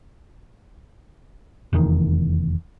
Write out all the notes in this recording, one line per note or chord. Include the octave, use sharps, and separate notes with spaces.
F1 E2 C3 D#3